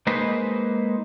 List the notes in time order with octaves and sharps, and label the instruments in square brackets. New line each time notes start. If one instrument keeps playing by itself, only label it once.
[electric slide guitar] G#3 A#3 D#4 B4 C5